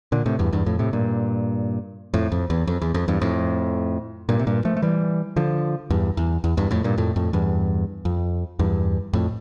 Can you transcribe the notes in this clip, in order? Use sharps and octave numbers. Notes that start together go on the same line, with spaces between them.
A#2 D3
A2 C3
E2 G2
E2 G2
F2 A2
A2 C3
G2 A#2
F2 A2
F2
E2
F2
E2
F2
E2 G2
F2 A2
G2 A#2
C3
G2 A#2
F3 A3
A3
E3 G3
D3 F3
E2 G2
E2
E2
E2 G2
F2 A2
G2 A#2
F2 A2
F2 A2
E2 G2
F2
E2 G2
F2 A2